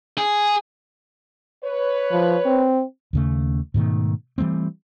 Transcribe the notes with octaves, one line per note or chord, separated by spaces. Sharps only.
G#4
B4 C#5
F3
C4
D#2 C#3 A3
G#2 B2 D#3 A3
E3 G3 A3 C4